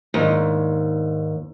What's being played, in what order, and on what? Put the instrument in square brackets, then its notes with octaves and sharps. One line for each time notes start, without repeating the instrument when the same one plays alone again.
[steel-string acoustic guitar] D#2 [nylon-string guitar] G#2 D4